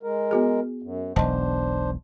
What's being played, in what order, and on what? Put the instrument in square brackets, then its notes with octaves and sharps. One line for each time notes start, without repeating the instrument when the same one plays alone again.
[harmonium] G#3 A#4
[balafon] B3 F#4 G#4
[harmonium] F#2
[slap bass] E1 B1 [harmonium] D4 C5 [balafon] D#5 A5